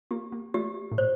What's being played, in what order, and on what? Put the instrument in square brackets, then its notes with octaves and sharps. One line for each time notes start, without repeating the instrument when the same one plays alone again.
[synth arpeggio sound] A#3 [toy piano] G4
[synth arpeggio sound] A#3
[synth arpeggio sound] A3 [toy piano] G4
[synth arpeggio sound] A2
[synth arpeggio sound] A#2 [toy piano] C5